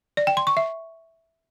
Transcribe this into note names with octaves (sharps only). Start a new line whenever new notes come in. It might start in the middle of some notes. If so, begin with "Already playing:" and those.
D5
G5
C6
C#6
E5